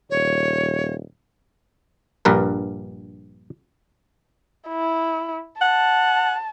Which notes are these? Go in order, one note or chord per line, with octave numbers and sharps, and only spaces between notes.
D#1 C#5
A#1 G2 A#4 B4
E4
F#5 A5